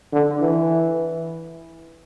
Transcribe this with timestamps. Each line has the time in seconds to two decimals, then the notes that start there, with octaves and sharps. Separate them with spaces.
0.13 D3
0.41 E3